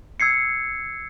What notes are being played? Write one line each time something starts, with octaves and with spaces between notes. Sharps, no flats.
E6 G#6 C7 C#7